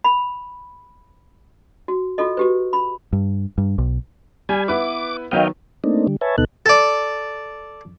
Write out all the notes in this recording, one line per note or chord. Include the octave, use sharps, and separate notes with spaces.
B5
F#4
F4 F#4 A4 D#5
F#4 G4 B4
B5
G2
G2
B1
G3 G#5
B3 E4 B4 D6
D#3 F#3 B3 D#5 F5 G5
A3 A#3 C4 D4 D#4
D3 G3
B4 C#5 E5 G#5 A5
D2 B2 B3 D#4 A4 F#6
A4 D5